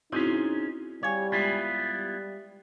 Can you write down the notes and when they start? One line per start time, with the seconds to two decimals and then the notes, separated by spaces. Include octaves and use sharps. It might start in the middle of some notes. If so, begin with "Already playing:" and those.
0.12 C4 C#4 D#4 E4 F#4 G#4 C5
1.03 G3 C#5 F5 G#5
1.32 G#3 B3 E4 F4
1.92 G3